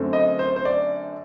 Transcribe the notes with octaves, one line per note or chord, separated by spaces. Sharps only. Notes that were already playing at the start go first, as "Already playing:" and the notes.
Already playing: F#2 D3 A3 C4
D#5
C5
C5
D5